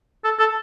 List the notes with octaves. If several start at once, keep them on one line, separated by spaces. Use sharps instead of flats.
A4
A4